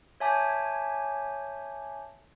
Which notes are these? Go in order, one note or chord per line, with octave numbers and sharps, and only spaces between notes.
C#5 E5 G#5 A5 D6 G6